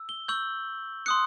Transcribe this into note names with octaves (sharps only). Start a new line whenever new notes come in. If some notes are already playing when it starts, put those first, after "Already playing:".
Already playing: E6
G7
C#6 E6 G6 F#7
C6 D#6 F#6 C#7